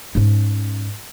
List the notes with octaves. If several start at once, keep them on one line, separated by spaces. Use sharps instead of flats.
G#2 C#4